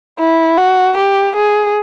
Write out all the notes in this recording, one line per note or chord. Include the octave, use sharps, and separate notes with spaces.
E4
F#4
G4
G#4